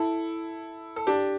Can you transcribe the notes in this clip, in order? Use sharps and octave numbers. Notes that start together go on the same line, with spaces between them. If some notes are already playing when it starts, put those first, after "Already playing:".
Already playing: E4 A4
A4
D4 G4